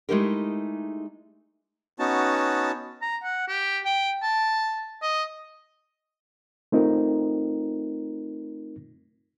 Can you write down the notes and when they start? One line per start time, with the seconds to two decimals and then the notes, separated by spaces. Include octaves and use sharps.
0.09 G#3 A3 D#4 E4 G4 A#4
1.99 B3 C#4 D#4 F#4 A5
3.02 A#5
3.23 F#5
3.48 G4
3.85 G5
4.22 A5
5.02 D#5
6.72 A3 C4 D#4 F4 A#4